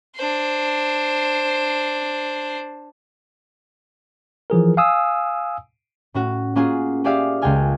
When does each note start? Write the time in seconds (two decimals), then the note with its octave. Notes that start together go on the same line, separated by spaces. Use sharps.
0.16 D4 C5
4.50 E3 F3 G#4 A#4
4.77 F5 G#5 D#6 E6
6.14 A2 C#4 F#4
6.55 A#3 C#4 F4 F#4 G#4
7.04 F4 G4 G#4 D5 E5 F5
7.42 C#2 G#3 A4 G5 G#5 F6